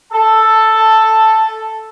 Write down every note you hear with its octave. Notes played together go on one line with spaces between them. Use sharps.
A4 A5